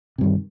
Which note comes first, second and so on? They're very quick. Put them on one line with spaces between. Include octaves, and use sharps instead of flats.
C3 G2 D#3